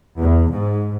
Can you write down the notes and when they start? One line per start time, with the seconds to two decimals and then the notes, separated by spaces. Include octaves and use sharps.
0.19 E2
0.50 G#2